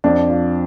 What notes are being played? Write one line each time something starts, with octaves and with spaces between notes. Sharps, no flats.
F2 D4
F3